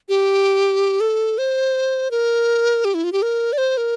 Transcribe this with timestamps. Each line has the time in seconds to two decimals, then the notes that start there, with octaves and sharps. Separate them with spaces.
0.09 G4
1.00 A4
1.38 C5
2.11 A#4
2.85 G4
2.94 E4
3.04 F4
3.13 G4
3.22 A#4
3.53 D5
3.58 C5
3.77 A#4